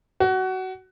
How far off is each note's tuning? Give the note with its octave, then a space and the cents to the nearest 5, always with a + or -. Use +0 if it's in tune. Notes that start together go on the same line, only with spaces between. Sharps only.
F#4 +20